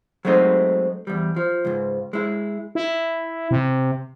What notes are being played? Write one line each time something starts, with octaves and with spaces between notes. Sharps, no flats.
F#3 G#3 A3 C4 D#4
E2 G3
F3
C#2 G#2
G#3 E4
E4
C3